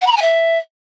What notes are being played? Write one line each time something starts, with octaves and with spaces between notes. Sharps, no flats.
F#5
B5
A#5
G#5
E5